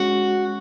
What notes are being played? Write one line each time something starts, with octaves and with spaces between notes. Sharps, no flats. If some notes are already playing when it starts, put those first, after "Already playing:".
Already playing: G#3 C#4 F#4